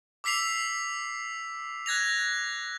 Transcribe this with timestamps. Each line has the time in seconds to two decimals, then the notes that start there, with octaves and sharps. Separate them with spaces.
0.24 D6 E6 B6 C7 F7
1.86 F#6 G#6 A#6 F7